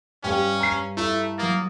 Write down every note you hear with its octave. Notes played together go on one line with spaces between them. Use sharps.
G2 G3 C#4 G5
A#5 C7
A3 E4 A#5
F#3 A#3 D#6 A6